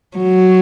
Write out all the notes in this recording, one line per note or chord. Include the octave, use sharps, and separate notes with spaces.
F#3